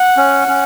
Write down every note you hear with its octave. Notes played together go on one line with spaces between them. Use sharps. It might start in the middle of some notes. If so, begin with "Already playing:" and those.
Already playing: F#5
C#4
C#4